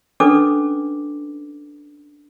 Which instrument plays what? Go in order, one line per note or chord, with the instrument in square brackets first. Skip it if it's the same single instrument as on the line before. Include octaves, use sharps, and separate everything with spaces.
[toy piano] C#4 D4 A4 B4 D6